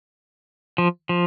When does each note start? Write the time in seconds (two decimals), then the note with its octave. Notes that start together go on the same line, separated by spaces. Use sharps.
0.78 F3
1.09 F3